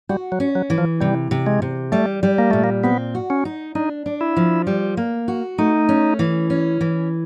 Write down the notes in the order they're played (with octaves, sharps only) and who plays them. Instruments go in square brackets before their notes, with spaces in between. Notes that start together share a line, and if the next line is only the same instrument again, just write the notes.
[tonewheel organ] G3 [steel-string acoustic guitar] F#4
[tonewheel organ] F#3
[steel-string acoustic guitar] C#4
[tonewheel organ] F#3
[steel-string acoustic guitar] E3
[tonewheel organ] F3
[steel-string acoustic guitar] C3 [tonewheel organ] G3
[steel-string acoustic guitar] C3
[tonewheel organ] G#3
[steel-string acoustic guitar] C3
[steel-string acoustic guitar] G3 [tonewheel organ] A3
[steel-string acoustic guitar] G3
[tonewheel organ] A#3
[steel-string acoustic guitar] A#2 [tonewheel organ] A3
[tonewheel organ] A#3
[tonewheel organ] B3 [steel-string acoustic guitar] C4
[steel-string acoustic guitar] F#4
[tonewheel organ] C#4
[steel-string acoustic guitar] D#4
[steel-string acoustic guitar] D4 [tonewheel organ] D#4
[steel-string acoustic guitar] D4
[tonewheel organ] E4
[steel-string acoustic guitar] F3
G3
A#3
F#4
[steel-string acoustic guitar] A3 [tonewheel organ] D#4
[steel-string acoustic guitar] C#4
E3
C#4
E3